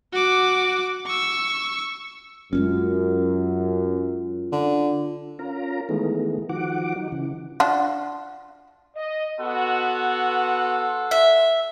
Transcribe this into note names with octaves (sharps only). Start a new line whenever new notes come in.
F#4 D6
C#6 E6
F#2 G#3 A#3 C#4 F4
D3
C#4 F4 A#4 A#5
D#3 E3 G#3 A3 B3
D#3 F3 F#4 F#5 D6
F#3 D#4
C#3 E3
D4 F4 F#4
D#5
B3 F#4 A4 F#5 C6
E5